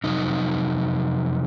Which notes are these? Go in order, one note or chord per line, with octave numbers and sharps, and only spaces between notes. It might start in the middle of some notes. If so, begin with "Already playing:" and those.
F2 C3 F#3 D#4